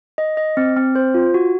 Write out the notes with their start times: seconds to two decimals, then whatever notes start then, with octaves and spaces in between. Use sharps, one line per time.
0.18 D#5
0.37 D#5
0.57 C4
0.76 C4
0.95 C5
1.14 F4
1.34 F#4